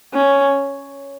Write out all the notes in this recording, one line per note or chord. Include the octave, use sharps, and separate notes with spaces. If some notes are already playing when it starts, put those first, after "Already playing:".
C#4